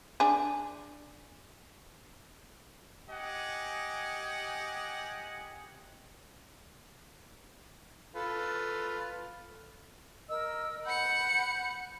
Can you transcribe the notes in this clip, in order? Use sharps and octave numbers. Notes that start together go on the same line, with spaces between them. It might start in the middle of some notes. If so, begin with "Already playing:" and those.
D4 G#4
G4 D#5 F#5 G#5
F4 A4 B4
A#4 D#5 E6
F#5 B5 G6 C#7